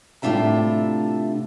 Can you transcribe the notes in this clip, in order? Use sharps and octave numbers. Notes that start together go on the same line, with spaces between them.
A2 C3 D4 F4 E5 A#5